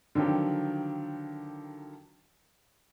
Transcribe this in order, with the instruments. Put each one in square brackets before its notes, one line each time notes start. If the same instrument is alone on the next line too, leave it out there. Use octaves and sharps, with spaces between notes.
[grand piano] D3 D#3 F3 F#3 G4